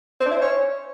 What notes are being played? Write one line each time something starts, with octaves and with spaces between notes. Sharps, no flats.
C4
D4
E4
C5
C#5